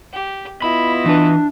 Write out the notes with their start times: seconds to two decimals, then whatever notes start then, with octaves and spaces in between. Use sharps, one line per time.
0.13 G4
0.62 B3 E4 F4 D#5 B5
1.06 E3 D4 B4